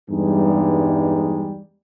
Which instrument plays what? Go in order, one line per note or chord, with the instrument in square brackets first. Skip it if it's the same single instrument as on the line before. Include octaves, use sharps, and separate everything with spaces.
[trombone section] E2 G2 G3 G#3 D#4